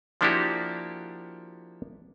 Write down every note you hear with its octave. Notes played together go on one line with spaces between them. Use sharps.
F3 A#3 D4 E4 F#4 G4